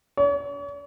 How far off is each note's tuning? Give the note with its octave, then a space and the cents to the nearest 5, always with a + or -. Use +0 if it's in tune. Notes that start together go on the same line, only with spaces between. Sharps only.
C#5 +45